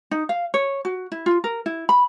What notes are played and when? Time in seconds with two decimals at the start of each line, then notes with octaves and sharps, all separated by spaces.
0.11 D#4
0.29 F5
0.54 C#5
0.85 F#4
1.12 E4
1.26 F4
1.44 A#4
1.66 E4
1.89 B5